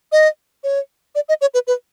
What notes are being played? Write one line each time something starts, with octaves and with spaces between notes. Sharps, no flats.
D#5
C#5
D5
D#5
C#5
B4
B4